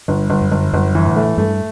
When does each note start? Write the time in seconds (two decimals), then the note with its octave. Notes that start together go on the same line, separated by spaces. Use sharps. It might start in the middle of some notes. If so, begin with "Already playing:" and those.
0.08 G1 G2
0.30 G1
0.41 F#2
0.52 G1
0.73 G1 F#2
0.95 E3
1.06 A2
1.16 A3
1.38 G2 A3